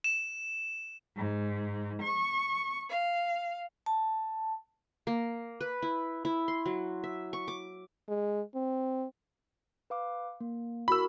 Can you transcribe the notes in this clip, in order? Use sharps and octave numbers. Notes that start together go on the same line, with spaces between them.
E7
G#2
C#6
F5
A5
A#3
B4
E4
E4
C6
F#3
E5
C#6
D6
G#3
C4
B4 F5 D6
A#3
E4 F#4 A#4 B5 E6